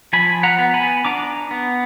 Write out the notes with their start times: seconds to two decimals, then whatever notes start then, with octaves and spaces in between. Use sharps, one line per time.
0.13 F3 G#5 B5
0.43 F#5 A#5
0.58 B3
0.74 G#5 B5
1.05 D4 A#5 D6
1.51 B3